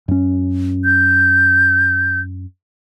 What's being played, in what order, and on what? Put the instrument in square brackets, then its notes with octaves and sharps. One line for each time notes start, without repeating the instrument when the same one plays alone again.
[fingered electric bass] F#2 C#4
[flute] G6